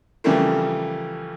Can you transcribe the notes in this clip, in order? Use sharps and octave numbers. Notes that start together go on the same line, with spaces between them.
C#3 E3 F3 G3 A3 A#3